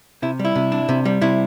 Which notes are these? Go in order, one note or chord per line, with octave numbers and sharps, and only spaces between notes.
C3 E4
G3
E4
C3
D4
C3
G3
C3 E4